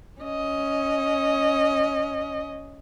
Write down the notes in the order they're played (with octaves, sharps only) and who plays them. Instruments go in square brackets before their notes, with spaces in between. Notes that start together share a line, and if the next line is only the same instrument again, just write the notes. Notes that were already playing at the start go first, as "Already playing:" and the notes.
[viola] C#4 D#5